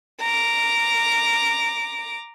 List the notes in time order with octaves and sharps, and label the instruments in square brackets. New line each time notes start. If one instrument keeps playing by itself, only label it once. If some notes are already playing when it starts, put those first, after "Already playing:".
[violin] A#5 D6